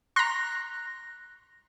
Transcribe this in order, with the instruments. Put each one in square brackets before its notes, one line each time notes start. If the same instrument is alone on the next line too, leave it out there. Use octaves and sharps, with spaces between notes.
[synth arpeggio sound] A#5 C6 [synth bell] F#6 A#6